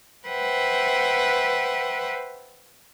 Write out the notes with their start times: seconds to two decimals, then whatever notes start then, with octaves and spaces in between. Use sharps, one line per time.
0.27 B4 C5 E5 F#5 G5